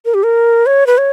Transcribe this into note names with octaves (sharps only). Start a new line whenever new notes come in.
A#4
G4
A#4
C#5
B4
C#5